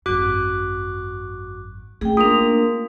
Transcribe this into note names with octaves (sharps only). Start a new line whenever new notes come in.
G#1 F#2 F#4 D6 F#6
A3 C#4 G#4 G5
A#3 D4 F4 A#4 D#6 F7